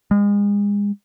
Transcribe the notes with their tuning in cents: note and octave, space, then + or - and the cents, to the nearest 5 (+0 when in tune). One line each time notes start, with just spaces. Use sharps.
G#3 -35